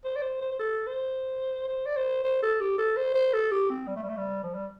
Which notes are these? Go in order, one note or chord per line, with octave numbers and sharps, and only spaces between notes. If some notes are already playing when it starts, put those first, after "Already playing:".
C5
D5
C5
C5
C5
A4
C5
C5
D5
C5
C5
A4
G4
A4
C5
C5
A4
G4
C4
G3
A3
G3
A3
G3
F3
G3